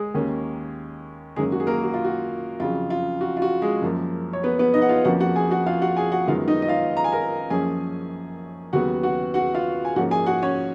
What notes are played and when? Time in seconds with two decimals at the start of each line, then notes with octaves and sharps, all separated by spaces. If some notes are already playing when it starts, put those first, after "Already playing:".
Already playing: G#3 G#4
0.14 D#2 D#3 A#3 C#4
1.36 F#2 D#3 G#3 A#3 C#4 G#4
1.52 F#4
1.60 G#4
1.67 A#3 A#4
1.83 F#4
1.94 F4
2.04 F#4
2.60 F2 C#3 F#3 F4
2.90 F4
3.21 F#4
3.37 F4
3.42 F#4
3.62 G#3 G#4
3.82 F#2 F3 A#3
4.33 C#5
4.43 B3 B4
4.59 B3 B4
4.74 D#4 D#5
4.82 F#5
4.89 F4 F5
5.05 F2 F3 A#3 C#4 F#4 F#5
5.20 F#4 F#5
5.36 G#4 G#5
5.51 F#4 F#5
5.66 F4 F5
5.82 F#4 F#5
5.97 G#4 G#5
6.12 F#4 F#5
6.27 F#2 D#3 G#3 B3 F4 F5
6.48 D#4 D#5
6.62 D#5
6.68 F4 F5
6.97 A#5
7.04 G#5
7.12 A#4 A#5
7.50 F#2 F3 A#3 C#4 G#4 G#5
8.73 D#2 C#3 F#3 B3 F#4 F#5
9.03 F#4 F#5
9.34 F#4 F#5
9.55 F4 F5
9.85 G#5
9.96 G#2 F3 A#3 C#4 F#4 F#5
10.11 G#4 G#5
10.26 F#4 F#5
10.42 C#4 C#5